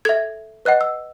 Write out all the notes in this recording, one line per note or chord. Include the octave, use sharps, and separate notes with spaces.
A4 E5 G#6
B4 D#5 F#5 F#6
E6